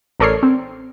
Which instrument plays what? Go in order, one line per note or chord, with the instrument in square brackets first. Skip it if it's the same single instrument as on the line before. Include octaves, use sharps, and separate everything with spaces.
[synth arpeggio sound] A1 A4 A#4 C#5 D5 C7
C4